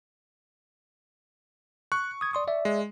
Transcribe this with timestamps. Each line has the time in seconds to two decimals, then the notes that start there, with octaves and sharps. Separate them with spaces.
1.92 C#6 F#6
2.21 D#6 G#6
2.33 D5 C6 D#6
2.47 D5 E5
2.65 G#3